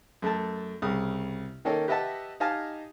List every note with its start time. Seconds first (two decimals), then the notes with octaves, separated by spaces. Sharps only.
0.22 F#2 A3 A4 A5
0.82 C2 C#3 D#6
1.65 D#3 A#3 C#4 D#4 A4
1.88 G4 B4 D#5 E5 F#5 A5
2.40 D#4 G4 D#5 F5 G#5 A5